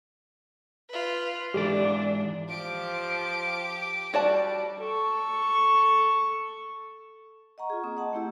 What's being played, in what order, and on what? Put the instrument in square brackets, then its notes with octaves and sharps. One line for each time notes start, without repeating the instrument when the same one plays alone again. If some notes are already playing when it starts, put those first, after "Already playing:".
[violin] F4 B4
[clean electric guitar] G#2 E3 D5 [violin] D4 [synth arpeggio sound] G4 A4
[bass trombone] F3 [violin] G4 D7
[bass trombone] G3 [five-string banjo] F#4 D5 A5
[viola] A4 C#6
[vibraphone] D#5 F#5 A#5 C#6
F4 G#4
A#3 C4 D#6
D#5 F#5 A5
A3 A#3 E4 G4 E6